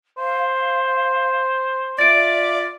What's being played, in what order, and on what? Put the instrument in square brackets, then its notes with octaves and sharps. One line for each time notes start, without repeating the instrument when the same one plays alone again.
[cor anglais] C5 [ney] F5
[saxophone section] F4 D5 [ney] E5 [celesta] A6 D7